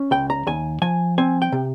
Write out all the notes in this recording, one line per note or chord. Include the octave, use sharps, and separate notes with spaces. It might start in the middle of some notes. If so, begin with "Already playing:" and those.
Already playing: C#4
C#2 G5
A#5
D#2 G#5
F3 G#5
C4 G#5
G5
C3